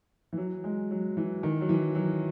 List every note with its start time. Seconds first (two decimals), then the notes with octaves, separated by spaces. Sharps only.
0.33 E3
0.37 F#3
0.64 G#3
0.91 F#3
1.17 E3
1.43 D#3
1.61 F#3
1.69 E3
1.95 F#3